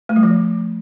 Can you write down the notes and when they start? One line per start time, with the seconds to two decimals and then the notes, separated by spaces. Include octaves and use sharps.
0.09 A3
0.16 G3
0.23 F3